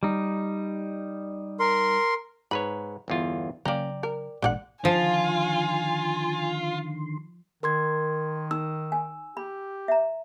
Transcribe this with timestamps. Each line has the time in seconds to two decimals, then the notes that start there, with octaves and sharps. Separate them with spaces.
0.03 G3 D#4
1.60 A#4 C6
2.51 G#2 B4 C#5 B5
3.08 G1 E2 F4
3.65 C#3 F#3 A#3 C#4 D5 G5 A#5
4.03 A#4
4.42 A1 A#2 D3 G#3 G4 F#5
4.85 D3 D#3 F3 F4 G#5 C6
7.63 D#3 A#4 C6 G#6
8.51 D#4 E6
8.92 G#5
9.37 G4 B5
9.88 E5 A#5